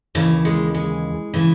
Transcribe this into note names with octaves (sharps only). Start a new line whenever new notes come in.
D#2 C#3 E3
G#3
G#3
C#3 E3